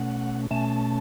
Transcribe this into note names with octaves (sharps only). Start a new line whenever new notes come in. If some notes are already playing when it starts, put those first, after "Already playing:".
Already playing: B2 A3 C#4 F#5
B2 A3 C#4 A5